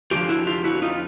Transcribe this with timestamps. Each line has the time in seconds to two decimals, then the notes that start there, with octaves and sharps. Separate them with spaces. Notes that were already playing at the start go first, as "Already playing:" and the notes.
0.11 F2 D3 F3 F4 G4
0.29 E4 F#4
0.47 F4 G4
0.64 E4 F#4
0.82 D#4 F4